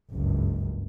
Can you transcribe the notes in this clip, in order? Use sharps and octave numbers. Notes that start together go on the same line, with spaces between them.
F#1 C#2 G2